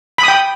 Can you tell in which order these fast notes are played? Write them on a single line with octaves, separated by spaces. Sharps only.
B5 D#6 G5